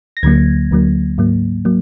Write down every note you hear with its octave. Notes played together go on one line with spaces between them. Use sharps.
A#6
D2 D3 F#3 A#3 G#6
D2 D3 F#3 A#3
G#2 F#3 A#3
F#3 A#3